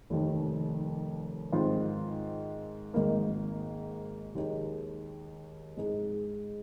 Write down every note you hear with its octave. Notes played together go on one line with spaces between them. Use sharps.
F1 D#2 D#3
G#2 D#3 C4 F4
G#1 G#2 D#3 A#3 D#4
D#2 D#3 G#3 D#4
G#2 G#3 D#4 G#4